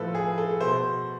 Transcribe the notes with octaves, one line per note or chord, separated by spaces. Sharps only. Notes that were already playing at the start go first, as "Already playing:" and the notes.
Already playing: A2 F3 A4 B4
G#4
A4
B2 C5